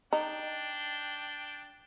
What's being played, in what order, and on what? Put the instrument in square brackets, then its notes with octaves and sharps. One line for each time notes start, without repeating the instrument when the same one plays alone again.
[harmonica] D4 G5 [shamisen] D#4